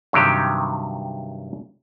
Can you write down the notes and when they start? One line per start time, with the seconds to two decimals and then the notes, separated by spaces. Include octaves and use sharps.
0.13 G2 C3 D#3 F#3 G4